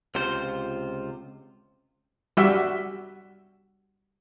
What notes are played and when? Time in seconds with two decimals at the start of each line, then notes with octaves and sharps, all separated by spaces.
0.15 C#2 C3 F4 C5
2.37 G3 F#4 E5